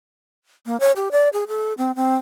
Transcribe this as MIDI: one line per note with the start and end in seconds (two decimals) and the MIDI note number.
0.66 0.77 58
0.80 0.92 73
0.96 1.08 67
1.12 1.29 74
1.33 1.44 68
1.48 1.73 69
1.78 1.95 60
1.95 2.16 60